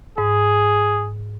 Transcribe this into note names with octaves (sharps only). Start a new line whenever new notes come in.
G#2 G#4